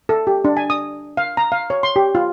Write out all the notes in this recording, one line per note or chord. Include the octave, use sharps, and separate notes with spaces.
A4
G4
D4
G#5
D#6
F5
A#5
F5
C#5
C6
G4
F4